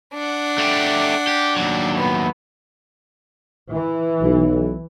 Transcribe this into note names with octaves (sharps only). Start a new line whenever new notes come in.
D4 F#5
A3 G4
G4
D#2 F#3
B3
E3
B1